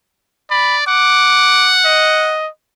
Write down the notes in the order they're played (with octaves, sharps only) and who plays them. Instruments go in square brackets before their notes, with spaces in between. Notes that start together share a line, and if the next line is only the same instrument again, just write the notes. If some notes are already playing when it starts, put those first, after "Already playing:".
[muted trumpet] D5 [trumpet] B5
[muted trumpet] F#5 [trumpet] D6
[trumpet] D#5